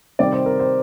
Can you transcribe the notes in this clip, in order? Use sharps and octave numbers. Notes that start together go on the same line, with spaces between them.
C3 D#3 G3 D5
C5
A#4
C5